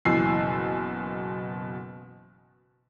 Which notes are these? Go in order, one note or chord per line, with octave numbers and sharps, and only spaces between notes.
F#1 B2 E3 G#5 E6 C7